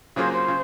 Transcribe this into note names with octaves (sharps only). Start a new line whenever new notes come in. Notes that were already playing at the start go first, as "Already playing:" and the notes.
C#3 F#3 A#3 F4 G#4 C5
C5
C#3